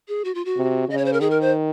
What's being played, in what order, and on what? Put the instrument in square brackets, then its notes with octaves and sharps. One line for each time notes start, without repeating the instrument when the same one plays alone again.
[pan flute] G#4
F#4
F4
F#4
[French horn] C3
[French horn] C#3 [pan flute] D#5
[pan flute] C#5
C5
A#4
[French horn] D#3 [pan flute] G#4
[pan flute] A#4
C5